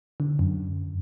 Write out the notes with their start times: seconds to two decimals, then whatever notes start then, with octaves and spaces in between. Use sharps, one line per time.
0.20 D3
0.39 F#2